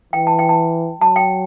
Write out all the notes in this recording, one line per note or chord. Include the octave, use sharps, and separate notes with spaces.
E3 G5
A5
G5
A5
F#3 A5
G5